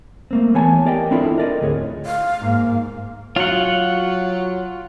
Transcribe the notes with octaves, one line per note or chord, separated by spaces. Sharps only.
A3 A#3 C4
E3 B3 C#5 G#5 A5
G4 A#4 D5 D#5 F5 G5
C4 D4 E4 F4 A4
A#4 D5 D#5
D2 A2 G#4 C5 C#5
F5
G#2 A#3
F#3 F4 F#5